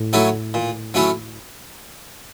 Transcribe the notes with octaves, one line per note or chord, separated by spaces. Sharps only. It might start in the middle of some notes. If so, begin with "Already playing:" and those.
Already playing: A2
F#3 A3 C#4 E4
A#2
F#3 A3 C#4 E4